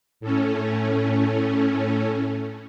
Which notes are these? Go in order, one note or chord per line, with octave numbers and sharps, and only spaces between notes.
A2 A3 C#4